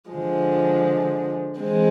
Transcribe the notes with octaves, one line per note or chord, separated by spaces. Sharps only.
D3 F3 G#3
E3 G#3 C4